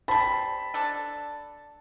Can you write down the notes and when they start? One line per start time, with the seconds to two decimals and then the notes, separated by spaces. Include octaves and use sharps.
0.08 G3 C4 A5 B5
0.74 D4 A4